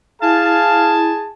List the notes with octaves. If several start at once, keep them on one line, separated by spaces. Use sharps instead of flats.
E4 G#4 F5 G#5 A5